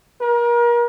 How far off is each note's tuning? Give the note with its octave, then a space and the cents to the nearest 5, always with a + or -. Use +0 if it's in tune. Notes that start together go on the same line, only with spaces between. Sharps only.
A#4 +35